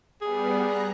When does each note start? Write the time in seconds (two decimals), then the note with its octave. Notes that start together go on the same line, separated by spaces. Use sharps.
0.21 G3 B3 G#4
0.60 A#5 F#6